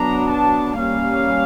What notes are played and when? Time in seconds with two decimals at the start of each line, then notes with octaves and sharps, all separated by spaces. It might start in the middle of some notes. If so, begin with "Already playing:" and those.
Already playing: F#3 B3 D4 A#5
0.31 A5
0.78 G3 A#3 C#4 F5